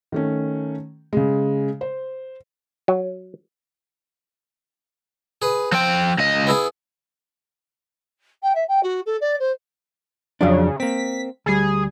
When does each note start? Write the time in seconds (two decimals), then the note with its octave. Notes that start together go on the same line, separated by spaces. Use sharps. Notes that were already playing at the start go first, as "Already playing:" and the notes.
0.12 D#3 A3 C#4
1.13 C#3 G#3
1.81 C5
2.88 F#3
5.42 G#4 B4
5.72 F3 C4 G5
6.18 C#2 D#5
6.47 B3 E4 G#4
8.42 G5
8.55 E5
8.68 G5
8.83 F#4
9.06 A4
9.21 D5
9.39 C5
10.41 F2 C#3 F#3 D4
10.80 A#3 C4 B6
11.46 D2 G3 G#4